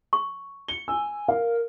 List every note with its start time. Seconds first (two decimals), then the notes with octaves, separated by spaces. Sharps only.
0.13 C#6
0.68 C#7 G7
0.88 G#5 E6
1.28 A#4 F5